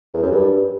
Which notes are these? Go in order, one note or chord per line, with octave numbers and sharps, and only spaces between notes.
E2
F#2
G2